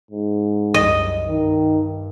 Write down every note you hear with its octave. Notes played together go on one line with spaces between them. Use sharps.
G#2
C2 F#2 D#5
G2 D#3